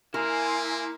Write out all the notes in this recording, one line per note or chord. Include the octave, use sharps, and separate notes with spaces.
A#3 E4 A#4 G#5 C6